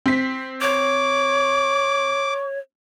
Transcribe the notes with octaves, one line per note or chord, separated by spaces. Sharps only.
C4 B6
C#5 C#6 D6